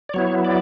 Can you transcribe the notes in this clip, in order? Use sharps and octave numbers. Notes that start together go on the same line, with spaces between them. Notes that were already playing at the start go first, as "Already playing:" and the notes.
D5
F#3 B3 E4 C#5
D5